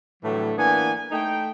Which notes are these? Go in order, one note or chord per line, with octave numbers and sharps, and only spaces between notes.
A2 D3 E3 F#3 G3 A3
E3 A#3 B3 D4 G#5
A3 D#4 G5